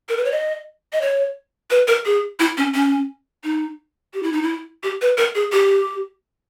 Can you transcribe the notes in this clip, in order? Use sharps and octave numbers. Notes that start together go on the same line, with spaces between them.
A#4
B4
C#5
D#5
D#5
C#5
B4
A#4
G#4
E4
C#4
C#4
D#4
G4
E4
D#4
E4
G4
B4
A#4
G#4
G4